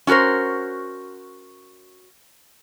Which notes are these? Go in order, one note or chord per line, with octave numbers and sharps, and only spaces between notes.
C#4 F#4 A4 A#4 C5